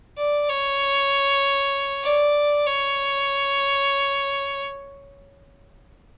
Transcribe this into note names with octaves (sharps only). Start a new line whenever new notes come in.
D5
C#5
D5
C#5